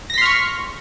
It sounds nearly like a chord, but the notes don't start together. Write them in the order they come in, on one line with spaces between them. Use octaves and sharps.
A#6 B6 C6 F6 C#6